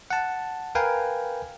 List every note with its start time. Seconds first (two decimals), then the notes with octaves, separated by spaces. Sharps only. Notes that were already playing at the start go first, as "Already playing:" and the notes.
0.10 F#5 A5
0.75 A#4 B4 F5 G5 G#5